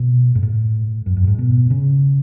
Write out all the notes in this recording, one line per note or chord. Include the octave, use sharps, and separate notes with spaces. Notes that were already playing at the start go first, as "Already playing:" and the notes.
Already playing: B2
G#2
A2
F#2
F#2
G#2
B2
C#3